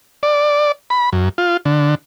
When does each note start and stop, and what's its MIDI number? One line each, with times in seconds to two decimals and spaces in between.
0.23 0.72 74
0.90 1.10 83
1.13 1.29 42
1.38 1.57 65
1.65 1.95 50